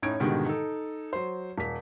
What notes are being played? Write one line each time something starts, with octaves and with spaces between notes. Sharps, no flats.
A2 C#4 D#4 G#6 D7
G#2 B2 D3 D#3 G3
D#4 A4
F#3 C5
D#1 B6